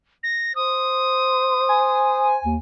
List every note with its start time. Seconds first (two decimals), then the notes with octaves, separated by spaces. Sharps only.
0.23 A#6
0.55 C5 D#6
1.69 G#5
2.44 D#2